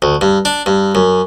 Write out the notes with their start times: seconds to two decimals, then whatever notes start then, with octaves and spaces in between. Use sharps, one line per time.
0.02 D2
0.21 G2
0.45 D4
0.66 G2
0.95 F#2